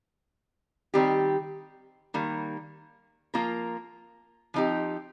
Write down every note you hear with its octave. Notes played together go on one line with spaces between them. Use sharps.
D#3 G3 C4 G4
D#3 G3 A#3
F3 A#3 F4 A#4
F3 C4 D#4 G4